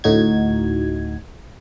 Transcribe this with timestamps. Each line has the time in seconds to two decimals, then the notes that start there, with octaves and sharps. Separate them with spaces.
0.04 D2 A2 D#4 F#4 G#6